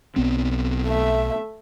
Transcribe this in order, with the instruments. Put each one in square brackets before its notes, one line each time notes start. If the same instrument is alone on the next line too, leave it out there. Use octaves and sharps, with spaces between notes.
[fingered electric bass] B1 B3 C4
[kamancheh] A3 E5